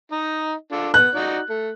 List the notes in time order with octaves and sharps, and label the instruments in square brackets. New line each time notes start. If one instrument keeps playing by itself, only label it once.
[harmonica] D#4 D#5
D4 F4 A4
[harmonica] B3 [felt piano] F#6
[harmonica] D#4 F#4 D5
A3